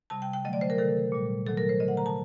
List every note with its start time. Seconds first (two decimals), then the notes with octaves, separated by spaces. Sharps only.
0.10 C3 G3 A5
0.22 G5
0.33 G5
0.44 D3 F#3 A3 D#5
0.53 D5
0.61 C5
0.70 A#4
0.78 C3 D#3 A3 A4
1.12 A#2 G3
1.46 C3 D#3 F#3 A3 A4
1.57 A#4
1.69 C5
1.80 D3 A3 D#5
1.88 F#5
1.97 A#5
2.06 A5